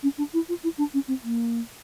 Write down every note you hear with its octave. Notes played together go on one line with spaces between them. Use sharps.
C#4
D4
E4
F4
E4
D4
C#4
C4
A#3